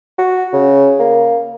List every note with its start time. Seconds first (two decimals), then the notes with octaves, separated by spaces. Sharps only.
0.18 F#4
0.53 C#3
1.00 A#3